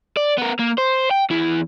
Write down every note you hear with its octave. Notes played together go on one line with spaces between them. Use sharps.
D5
B3 A#4
A#3
C5
G5
E2 E4